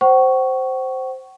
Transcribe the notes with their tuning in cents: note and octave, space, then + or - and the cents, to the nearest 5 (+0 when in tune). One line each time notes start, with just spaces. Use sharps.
C5 +0 F#5 +45 C#6 +0